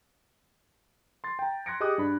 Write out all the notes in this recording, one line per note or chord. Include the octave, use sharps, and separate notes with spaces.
C6 A6
G5 A#5
C6 F#6 G#6 A#6 C#7 D7
G4 G#4 D#5 D6 D#6 F#6
G2 D4 B5